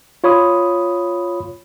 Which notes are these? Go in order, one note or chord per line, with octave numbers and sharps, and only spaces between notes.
F4 C#5 B5 D#6